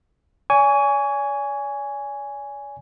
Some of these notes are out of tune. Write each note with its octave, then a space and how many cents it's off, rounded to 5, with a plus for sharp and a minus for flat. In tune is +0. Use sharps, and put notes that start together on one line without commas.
D5 -45 G#5 +0 C#6 +30